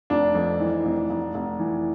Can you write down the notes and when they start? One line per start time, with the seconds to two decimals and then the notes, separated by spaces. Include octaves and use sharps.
0.10 F1 D4
0.35 F2
0.60 E3
0.85 F1
1.10 F1
1.34 F1
1.59 E3